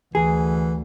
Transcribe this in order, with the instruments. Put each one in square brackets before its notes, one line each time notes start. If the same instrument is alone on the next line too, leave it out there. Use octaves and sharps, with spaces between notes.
[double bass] D2 [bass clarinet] E3 [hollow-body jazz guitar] G#4